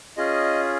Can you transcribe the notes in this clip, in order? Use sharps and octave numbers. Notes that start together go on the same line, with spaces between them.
C#4 F4 G#4 D#5